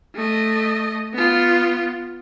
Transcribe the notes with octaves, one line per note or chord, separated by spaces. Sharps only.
A3 D#5
B3 F4